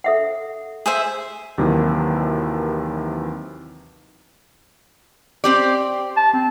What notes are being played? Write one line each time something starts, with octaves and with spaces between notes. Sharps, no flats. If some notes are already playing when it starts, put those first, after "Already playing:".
A4 E5 F#5
G#4 C5 E5
D#2 C3 D#3 E3 F#3
C4 G4 D5
A5
C4